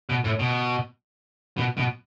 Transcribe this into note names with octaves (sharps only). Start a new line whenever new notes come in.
B2
A2
B2
B2
B2